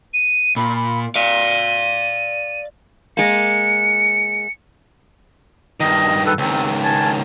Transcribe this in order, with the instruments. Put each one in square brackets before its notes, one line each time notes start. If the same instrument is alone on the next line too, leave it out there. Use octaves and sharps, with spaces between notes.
[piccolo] D#7
[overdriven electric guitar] A#2 [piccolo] B5
[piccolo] B5
[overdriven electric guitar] D5 F5 [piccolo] D#7
[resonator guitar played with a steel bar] G#3 A#3 [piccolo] C#7
[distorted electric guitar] G2 D#3 [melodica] D#5
[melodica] A4 B4
[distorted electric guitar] C#2 D#3 [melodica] C4
[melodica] G#5 A5